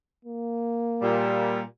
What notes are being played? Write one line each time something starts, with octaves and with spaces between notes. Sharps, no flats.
A#3
A#2 G3